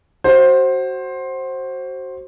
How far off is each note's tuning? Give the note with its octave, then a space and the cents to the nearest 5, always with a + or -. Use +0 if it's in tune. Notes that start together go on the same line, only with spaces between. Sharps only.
F#4 +20 C5 +15